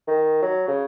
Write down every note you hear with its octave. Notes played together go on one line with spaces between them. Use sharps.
D#3
F#3
C#3